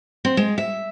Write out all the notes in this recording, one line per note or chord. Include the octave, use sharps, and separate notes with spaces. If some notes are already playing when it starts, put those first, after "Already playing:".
C4
G#3
E5